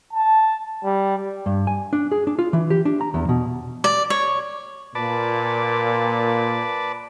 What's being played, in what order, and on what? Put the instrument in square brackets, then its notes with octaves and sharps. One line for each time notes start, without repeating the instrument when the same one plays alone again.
[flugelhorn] A5
G3
[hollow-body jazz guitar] G2
G#5
D4
G#4
D4
F4
E3
G4
D4
A#5
E2
B2
[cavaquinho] D5
C#5
[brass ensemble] A#2 [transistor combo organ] B4 D5 A5